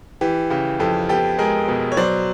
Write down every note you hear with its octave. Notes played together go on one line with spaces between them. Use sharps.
E3 G4
C#3 G4
F2 G4 A4
B3 G4 A4
G#3 G#4 A#4
B2
C#5
F#3 C5 D5